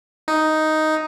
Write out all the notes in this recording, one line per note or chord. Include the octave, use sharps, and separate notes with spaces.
D#4